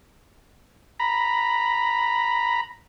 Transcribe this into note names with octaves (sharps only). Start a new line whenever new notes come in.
A#5 B5